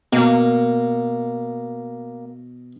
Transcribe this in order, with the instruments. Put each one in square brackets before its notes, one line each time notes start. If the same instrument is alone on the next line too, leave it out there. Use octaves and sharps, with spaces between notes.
[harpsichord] B2 [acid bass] A#3